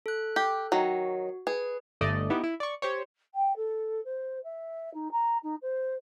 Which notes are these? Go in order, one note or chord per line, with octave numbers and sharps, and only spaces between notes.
A4 F#6
G4
D#3 F#3 F#4
G#4 B4
G1 A3 D5 D#5
B3 D#4 E4 G4
E4
D5 C#6
G4 C5 C#5
G5
A4
C5
E5
D#4
A#5
D#4
C5